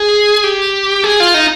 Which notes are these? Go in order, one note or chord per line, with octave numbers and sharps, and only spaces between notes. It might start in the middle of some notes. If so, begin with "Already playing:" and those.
Already playing: G#4
G4
G#4
F4
D#4